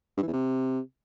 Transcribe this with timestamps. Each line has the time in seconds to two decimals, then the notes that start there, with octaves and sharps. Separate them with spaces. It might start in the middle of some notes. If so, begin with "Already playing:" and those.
0.17 G2
0.23 E3
0.28 E2
0.33 C3